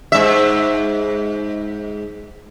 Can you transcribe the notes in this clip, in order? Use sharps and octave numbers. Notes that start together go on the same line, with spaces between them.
G#2 E5